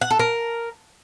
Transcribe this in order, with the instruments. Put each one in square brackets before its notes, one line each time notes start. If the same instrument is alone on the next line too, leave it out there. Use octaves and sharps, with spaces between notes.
[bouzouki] F#5
A4
A#4